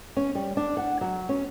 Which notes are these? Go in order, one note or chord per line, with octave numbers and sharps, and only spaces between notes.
C#4
G3
D4
F#5
F#3
C#4